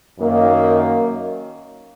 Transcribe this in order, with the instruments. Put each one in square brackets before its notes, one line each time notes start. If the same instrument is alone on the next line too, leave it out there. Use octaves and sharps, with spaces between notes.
[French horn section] F#2 D#3 A#3